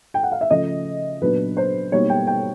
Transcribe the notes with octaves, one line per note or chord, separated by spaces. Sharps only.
G5
F#5
F5
E5
C#3 F3 A3 D#5
A#2 F#3 B3 D4 B4
C5
B2 G3 A#3 D#4 C#5
G5
G5